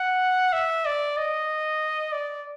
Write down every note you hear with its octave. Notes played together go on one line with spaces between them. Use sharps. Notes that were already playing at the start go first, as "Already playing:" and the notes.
Already playing: F#5
E5
D5
D#5
D5